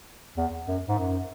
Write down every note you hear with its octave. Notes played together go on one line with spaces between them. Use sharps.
E2
F#2
G#2
F#2